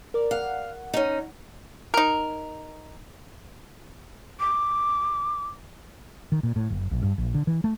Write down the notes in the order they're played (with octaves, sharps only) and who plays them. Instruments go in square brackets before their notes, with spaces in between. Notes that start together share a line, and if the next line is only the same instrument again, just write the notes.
[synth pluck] A#4 D5
[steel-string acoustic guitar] F5 [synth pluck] F#5
[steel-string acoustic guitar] C#4 D#4
[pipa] D#4 A#4
[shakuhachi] D6
[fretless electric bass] D#3
A#2
A2
F#1
A#1
G2
A#1
D3
E3
A3